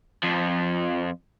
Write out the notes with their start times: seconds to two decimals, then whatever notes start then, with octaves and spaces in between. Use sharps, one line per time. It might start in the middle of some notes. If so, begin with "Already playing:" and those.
0.23 F2 F3